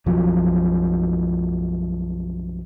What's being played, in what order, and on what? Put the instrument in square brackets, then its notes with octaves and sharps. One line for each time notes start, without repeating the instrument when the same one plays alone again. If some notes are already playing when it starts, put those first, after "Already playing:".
[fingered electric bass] B1 F#2 F3 F#3